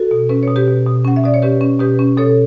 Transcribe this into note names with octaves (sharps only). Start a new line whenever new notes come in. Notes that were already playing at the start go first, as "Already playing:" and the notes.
Already playing: F#4 A4
B2
C#4 B4
C#5
B2
G4 B4
B2
B2
C#4 F#5
E5
B2 D5
C#5
C#4 G4 B4
C#4
B2 G4 B4
C#4
B2 A4 C#5